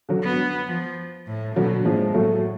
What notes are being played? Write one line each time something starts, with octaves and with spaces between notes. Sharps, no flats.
D3 F#3
B3
F3
A2
B2 D3 F#3
A2 F3 G#3
A2 F#3 A3